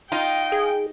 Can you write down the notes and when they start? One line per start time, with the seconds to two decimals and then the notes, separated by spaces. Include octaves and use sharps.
0.12 D#4 F4 G5
0.52 G#4